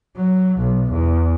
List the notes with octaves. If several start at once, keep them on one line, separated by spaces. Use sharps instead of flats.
F#3
B1
E2